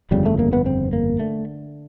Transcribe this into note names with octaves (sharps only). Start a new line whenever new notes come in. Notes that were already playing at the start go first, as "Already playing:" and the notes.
G1 F2 C#3 G3
A3
A#3
B3
C4
A#3
D3 A3